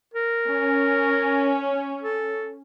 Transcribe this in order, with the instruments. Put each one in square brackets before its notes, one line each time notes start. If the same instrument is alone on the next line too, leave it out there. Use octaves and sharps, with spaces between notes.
[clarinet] A#4
[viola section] C#4
[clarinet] A4